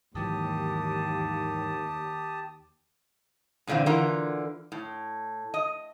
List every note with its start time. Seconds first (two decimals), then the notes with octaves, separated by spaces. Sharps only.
0.15 D#2 G#2 E3 F#3 G4 A5 D#6
3.67 G2 A#2 D3 E3 C4
3.86 D3 E3 F4 A#4
4.72 A2
5.54 D#5